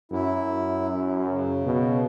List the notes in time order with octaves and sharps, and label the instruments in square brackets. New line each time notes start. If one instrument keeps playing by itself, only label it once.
[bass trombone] F#2 [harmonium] E4
[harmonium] C#3
[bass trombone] B2